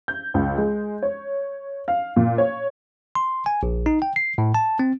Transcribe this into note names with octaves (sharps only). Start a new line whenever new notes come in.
G6
C#2
G#3
C#5
F5
A#2
C#5
C6
G#5
A#1
D#4
G5
C7
A2
A5
C4